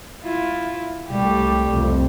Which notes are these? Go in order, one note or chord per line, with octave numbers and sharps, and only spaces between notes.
E4 F4
C2 G3 A3 G4
C2 F2